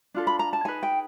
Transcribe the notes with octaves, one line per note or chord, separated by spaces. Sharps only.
D4 F4 A4
B5
A#5
A5
D#4 G#4 B4 G#5
G5